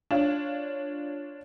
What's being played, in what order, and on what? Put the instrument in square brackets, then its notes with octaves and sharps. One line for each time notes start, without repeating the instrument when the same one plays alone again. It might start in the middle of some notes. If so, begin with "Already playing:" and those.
[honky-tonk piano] D4 F4 C#5